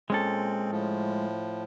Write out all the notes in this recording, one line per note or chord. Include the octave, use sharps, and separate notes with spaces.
A#2 G#3 C4 C#4 A4
A2 F3